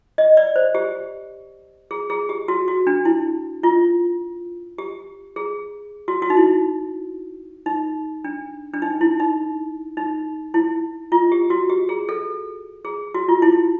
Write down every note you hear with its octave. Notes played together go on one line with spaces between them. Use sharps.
D#5
D5
C5
G4
G#4
G#4
G4
F#4
F#4
D4
E4
F4
G4
G#4
F#4
F#4
D#4
E4
D#4
D4
D4
D#4
E4
D#4
D#4
E4
F4
G4
F#4
G4
G#4
A4
G#4
F#4
F4
E4